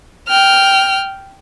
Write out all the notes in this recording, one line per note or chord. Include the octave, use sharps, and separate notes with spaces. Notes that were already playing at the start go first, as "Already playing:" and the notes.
G5 F6